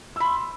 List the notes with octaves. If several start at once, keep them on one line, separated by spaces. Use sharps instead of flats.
B5 C6 E6